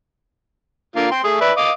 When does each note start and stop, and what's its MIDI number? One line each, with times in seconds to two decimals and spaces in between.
0.96 1.08 50
0.96 1.08 58
0.96 1.08 65
1.11 1.22 79
1.11 1.22 84
1.24 1.37 57
1.24 1.37 68
1.41 1.52 71
1.41 1.52 74
1.41 1.52 76
1.57 1.71 75
1.57 1.71 77
1.57 1.71 86